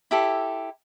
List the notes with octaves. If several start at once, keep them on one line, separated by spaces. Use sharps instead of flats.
E4 G4 A4